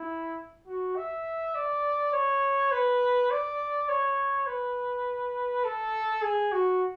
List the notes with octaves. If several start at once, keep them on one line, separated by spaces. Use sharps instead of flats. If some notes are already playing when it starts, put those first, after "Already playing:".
Already playing: E4
F#4
E5
D5
C#5
B4
D5
C#5
B4
A4
G#4
F#4